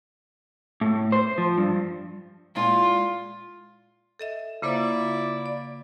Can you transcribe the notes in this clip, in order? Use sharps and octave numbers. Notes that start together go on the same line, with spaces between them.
A2
C5
F3
G2
A#2 G#3 E4 F4
A4 D#5 E5
C#3 A#3 E4 F4 C5 D5
D5